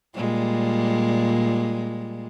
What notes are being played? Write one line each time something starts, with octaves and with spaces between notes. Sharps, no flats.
A#2 G3 G#3